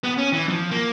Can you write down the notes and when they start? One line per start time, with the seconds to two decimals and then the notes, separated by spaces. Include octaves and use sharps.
0.04 B3
0.18 C#4
0.33 E3
0.49 F3
0.71 A#3